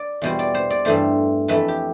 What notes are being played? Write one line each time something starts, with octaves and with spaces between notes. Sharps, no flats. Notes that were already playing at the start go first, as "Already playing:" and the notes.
Already playing: D5
E2 B2 G3 C5
D5
C5
D5
G2 E3 A3 C5
F2 E3 A3 B4
G4